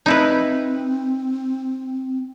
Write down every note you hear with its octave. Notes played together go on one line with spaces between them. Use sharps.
C4 D#4 E4 B4